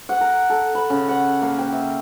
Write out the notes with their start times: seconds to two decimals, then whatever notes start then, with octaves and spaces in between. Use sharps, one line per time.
0.09 F#5
0.21 A#4
0.50 A4
0.75 B5
0.90 C#3
1.08 F#5
1.42 A#3
1.58 G5
1.73 E5